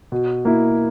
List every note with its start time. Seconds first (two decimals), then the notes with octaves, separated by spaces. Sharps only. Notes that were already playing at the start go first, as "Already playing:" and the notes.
0.12 B2
0.45 A#3 E4